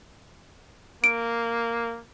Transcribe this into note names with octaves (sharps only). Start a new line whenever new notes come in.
A#3 D7